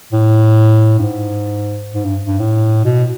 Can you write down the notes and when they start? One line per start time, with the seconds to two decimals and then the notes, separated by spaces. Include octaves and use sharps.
0.13 A2
0.99 G2
1.03 G#2
1.94 G#2
2.05 G2
2.27 G2
2.40 A2
2.85 B2